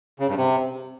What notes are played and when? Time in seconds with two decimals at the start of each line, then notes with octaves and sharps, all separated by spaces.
0.20 C#3
0.28 G2
0.37 C3